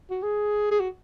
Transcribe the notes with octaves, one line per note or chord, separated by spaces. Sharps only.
F#4
G#4
G#4
F#4